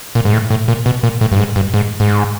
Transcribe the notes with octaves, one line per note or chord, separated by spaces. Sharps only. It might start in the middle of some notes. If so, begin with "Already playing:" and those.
A#2
G#2
A2
A2
A#2
B2
A#2
A2
G2
G#2
G2
G#2
G#2